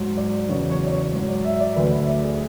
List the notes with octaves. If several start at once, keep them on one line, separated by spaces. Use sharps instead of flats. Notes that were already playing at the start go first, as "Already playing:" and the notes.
Already playing: G#2 F#3
D5
E2 C#3 F#3 C#5
C#5
D5
C#5
G#2 F#3 C#5
D5
E5
D5
D2 D3 F#3 B4
E5
D5
G#4